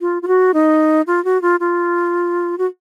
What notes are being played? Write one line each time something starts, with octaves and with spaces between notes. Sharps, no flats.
F4
F4
F#4
D#4
F4
F#4
F4
F4
F#4